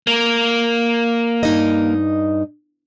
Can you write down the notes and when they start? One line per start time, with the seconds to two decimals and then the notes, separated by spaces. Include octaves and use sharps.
0.07 A#3
1.43 G2 D#4 D#5